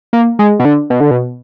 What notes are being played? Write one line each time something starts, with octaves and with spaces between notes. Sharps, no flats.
A#3
G#3
B2
D3
B2
D3
B2